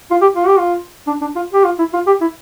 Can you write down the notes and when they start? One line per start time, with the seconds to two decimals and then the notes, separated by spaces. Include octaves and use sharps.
0.11 F4
0.21 G4
0.36 F4
0.47 G4
0.59 F4
1.07 D4
1.21 D4
1.36 F4
1.53 G4
1.64 F4
1.79 E4
1.93 F4
2.07 G4
2.21 E4